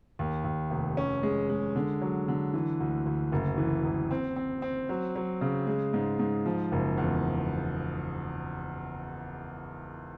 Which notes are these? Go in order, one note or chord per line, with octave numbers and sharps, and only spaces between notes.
D#2
D#2
F1
C#4
G#3
G#3
D3
F#3
D3
E3
D2
D2
F#1
E3
F#1
C4
C4
C4
F#3
F#3
C#3
G#3
G#2
G#2
F3
F#1
E2